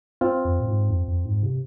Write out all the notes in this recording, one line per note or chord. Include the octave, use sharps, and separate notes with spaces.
C4 F4
F2
A#2
G#2
F2
F2
G#2
C3